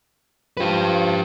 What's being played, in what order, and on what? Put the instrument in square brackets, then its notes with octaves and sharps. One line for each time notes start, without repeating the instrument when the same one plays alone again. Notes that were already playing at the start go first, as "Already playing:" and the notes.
[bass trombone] F3 [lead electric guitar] G4 B4